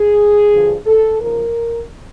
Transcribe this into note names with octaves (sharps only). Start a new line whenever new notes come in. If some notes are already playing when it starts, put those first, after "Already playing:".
Already playing: G#4
G2 D3 F3
A4
D#2 C#3 F3 A#4